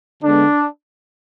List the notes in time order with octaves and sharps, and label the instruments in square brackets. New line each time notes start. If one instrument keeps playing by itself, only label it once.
[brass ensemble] D3 G#3 B3 D4